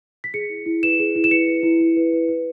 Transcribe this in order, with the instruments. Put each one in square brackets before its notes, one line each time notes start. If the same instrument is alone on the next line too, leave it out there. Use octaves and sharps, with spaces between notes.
[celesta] B6
G#4 C#7
E4
E4
B4 E7
G#4
E4
E7
B4 C#7
B4
E4
E4
B4
B4
B4